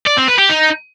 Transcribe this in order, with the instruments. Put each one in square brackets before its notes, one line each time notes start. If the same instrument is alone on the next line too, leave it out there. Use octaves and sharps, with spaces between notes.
[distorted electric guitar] D5
C4
B4
G4
D#4